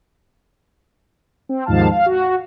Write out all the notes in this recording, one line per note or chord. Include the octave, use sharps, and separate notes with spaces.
C4
D#2 G#2 F3 F5 A5
F5
F#4